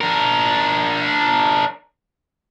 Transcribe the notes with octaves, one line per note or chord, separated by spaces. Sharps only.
D4 A#4